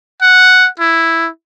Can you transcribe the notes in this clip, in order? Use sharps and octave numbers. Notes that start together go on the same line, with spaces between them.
F#5
E4